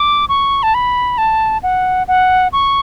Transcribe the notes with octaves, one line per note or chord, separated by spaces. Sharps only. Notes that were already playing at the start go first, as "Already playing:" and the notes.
Already playing: D6
C#6
A5
B5
A5
F#5
F#5
C#6